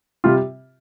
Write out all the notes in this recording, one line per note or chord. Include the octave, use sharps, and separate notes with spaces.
C3 G3 F4